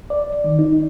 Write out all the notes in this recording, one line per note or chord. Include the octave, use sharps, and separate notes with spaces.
D5
D#3
D#4